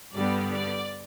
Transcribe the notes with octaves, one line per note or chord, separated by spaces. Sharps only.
G2 D3 G3 B3 D5
D5